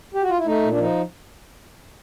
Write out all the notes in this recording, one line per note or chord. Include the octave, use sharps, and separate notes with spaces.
G4
F#4
F4
E4
A3 D#4
A#2
D4
F3 D#4